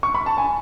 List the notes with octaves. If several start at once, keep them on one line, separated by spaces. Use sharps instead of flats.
C#6
B5
A5
G#5